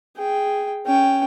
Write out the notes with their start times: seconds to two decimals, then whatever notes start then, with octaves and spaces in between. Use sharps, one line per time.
0.17 G#4 G5
0.87 C#4 G5